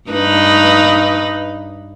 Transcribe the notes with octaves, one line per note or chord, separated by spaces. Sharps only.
G2 D#4 B4